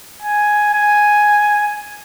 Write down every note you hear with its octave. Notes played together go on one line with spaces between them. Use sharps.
G#5
G#5